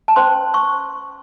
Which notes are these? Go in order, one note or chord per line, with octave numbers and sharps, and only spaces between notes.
A5
C#4 C5 C6
C#6